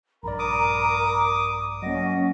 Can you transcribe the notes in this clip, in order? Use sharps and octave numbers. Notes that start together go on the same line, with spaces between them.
A#1 G2 A#4 D5 A#5 B5
D6 D#6
F#3 A#3 C#4 D#5 F#5